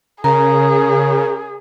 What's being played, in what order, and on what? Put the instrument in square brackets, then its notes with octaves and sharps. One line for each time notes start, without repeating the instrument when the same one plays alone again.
[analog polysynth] C#3 [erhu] G#4 [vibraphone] A#4 [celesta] A#5